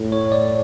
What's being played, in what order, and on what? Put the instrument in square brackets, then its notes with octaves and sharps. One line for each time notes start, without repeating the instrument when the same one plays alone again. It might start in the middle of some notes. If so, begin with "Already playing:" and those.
Already playing: [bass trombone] A2
[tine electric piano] C#5
D5